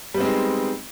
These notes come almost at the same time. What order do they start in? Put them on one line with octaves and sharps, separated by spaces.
G3 B3 C4 G#3 D#4